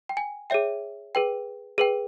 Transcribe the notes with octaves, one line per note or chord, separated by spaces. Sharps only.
G5
G#5
G#4 C#5 E5 G5
G#4 B4 G5
G#4 B4 G5